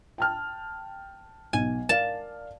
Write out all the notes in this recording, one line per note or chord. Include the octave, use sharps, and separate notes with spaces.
G5 A5 F6
B1 G#5
A#4 D5 F5 A5